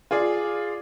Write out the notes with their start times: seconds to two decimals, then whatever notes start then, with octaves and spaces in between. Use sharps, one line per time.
0.11 F4 G#4 D5